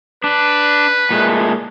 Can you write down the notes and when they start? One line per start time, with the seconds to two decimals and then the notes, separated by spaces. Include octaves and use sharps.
0.24 D4 B4
1.11 A#2 G#3 A3